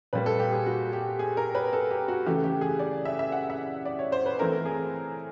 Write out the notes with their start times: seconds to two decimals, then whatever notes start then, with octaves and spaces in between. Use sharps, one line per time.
0.13 A#2 G3 A#3 B4
0.26 A4
0.40 G4
0.53 G#4
0.66 F#4
0.93 G4
1.19 G#4
1.37 A#4
1.55 B4
1.73 A4
1.91 G4
2.08 F#4
2.26 C#3 E3 A3 G4
2.44 G4
2.61 G#4
2.79 D5
3.05 E5
3.19 E5
3.32 F#5
3.50 E5
3.85 D5
3.99 C#5
4.12 C5
4.26 B4
4.39 E3 A3 C4 A#4
4.65 G#4